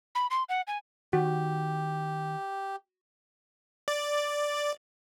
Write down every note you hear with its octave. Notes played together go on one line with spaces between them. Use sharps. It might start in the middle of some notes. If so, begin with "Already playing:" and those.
B5
C6
F#5
G#5
D#3 F#4 G4
D5